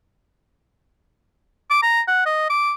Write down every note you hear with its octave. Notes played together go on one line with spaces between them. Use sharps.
D6
A#5
F#5
D#5
D6